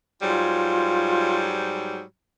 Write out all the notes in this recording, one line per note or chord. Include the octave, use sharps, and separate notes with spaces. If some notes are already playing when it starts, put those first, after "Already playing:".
G#2 F#3 G3 F4